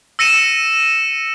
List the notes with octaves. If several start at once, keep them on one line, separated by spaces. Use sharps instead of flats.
E6 A#6 C#7 D#7 E7